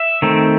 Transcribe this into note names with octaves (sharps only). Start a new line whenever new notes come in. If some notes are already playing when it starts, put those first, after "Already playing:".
Already playing: E5
D#3 A3 C4